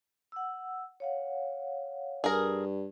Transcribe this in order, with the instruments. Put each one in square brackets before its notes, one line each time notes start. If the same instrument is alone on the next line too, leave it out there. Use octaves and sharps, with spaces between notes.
[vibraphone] F#5 E6
C#5 F5 F#5
[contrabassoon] G2 [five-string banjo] G#4 A#4